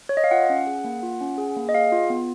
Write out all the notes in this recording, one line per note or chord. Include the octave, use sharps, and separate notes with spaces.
C#5
D#5
F5
F4 F#5
C#4
G#4
A#3
F4
C#4
G#4
A#3
D#5
G#4 F5
F4
B3